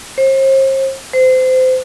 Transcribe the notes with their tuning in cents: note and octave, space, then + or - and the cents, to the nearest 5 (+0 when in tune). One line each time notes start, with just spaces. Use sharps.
C5 +40
C5 -25